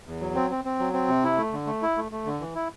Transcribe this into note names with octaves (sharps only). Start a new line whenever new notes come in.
E2
F#3
C4
C4
C4
F#3
C4
C3
E4
A3
D3
A3
E4
A3
A3
D3
E3
E4